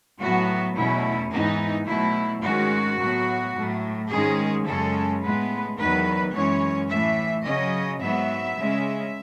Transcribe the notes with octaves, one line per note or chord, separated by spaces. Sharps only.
A2 F#3 B3 F#4
E2 B2 F#3 A3 C#4 E4
G#2 E3 B3 D#4
B2 F#3 A3 E4
G#2 D#3 G#3 C#4 F#4
A2 F#3 B3
A2 F#3 A3
G#2 D#3 G#3 C#4 G#4
F#2 C#3 G#3 C#4 A4
A2 G#3 B3 B4
E2 D#3 F#3 B3 B4
F#2 E3 G#3 C#4 C#5
A2 E3 A3 E5
C#3 F#3 C#4 D#5
G#2 F#3 B3 E5
C#3 G#3 C#4